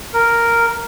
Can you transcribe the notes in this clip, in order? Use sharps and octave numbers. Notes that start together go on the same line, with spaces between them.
A#4